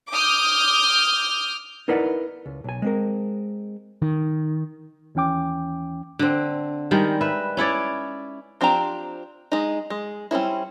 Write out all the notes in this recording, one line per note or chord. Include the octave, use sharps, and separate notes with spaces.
D6 D#6 F6 G6
D#4 E4 A#4 B4 D5 F#5
C#2
B1 G#5
G#3 C4 A#4
D#3
D#2 E3 C#4 G5 D6
D3 C4
D#3 G3 G#3 A#4
B4 E5
C#4 E4 C#5 D5
F3 C4 D4 G4 A#5
G#3 D#4
G#3
G3 C4 C#4 E4